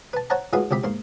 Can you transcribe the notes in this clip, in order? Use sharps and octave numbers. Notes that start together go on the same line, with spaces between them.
B4 A5
C5 C#5 F#5 A5 A#5
A2 G#3 F4 F#4 G#4 B4
C#2 C3 G4 B5
G#2 A#3 C6